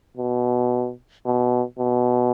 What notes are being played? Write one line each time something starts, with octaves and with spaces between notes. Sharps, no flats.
B2
B2
B2